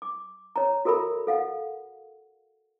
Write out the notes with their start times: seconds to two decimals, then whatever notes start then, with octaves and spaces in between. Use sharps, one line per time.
0.02 D6
0.56 C#5 A#5
0.85 F#4 A4 A#4 E5 B5
1.27 A4 F5 F#5